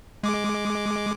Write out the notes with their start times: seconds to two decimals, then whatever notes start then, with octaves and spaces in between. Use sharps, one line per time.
0.23 G#3 D6